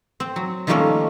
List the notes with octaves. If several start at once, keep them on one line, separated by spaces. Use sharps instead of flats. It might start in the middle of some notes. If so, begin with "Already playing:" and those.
C4
F#3
D#3 F3 G3 A3 A#3 C#4